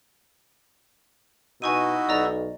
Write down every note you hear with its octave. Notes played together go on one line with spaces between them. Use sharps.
B2 D#4 E4 F#4 G#5 C#6 D#7
B1 D5 D#5 A#5